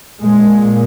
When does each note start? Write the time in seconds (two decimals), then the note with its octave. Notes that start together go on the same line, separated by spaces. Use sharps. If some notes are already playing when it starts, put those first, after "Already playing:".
0.22 A#2 G#3